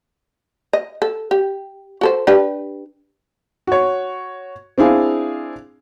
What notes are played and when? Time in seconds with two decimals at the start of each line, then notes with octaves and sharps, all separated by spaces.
0.73 D#5
1.02 A4
1.31 G4
2.01 F#4 A4 C5
2.27 D4 G4 B4
3.67 F#4 C#5
4.78 C4 D4 E4 G#4 F5